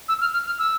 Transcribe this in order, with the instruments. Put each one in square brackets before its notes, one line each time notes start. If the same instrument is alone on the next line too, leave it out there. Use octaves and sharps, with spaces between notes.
[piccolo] E6
F6
F6
F6
E6